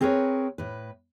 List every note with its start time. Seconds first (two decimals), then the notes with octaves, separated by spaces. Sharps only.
0.01 C4 G#4 A#4 B4 C#5
0.58 A2 B4